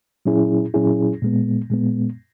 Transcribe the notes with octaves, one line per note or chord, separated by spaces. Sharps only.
A#2 F#3 C#4 E4 G#4
A#2 F#3 C#4 E4 G#4
A#2 G#3 B3
A#2 G#3 B3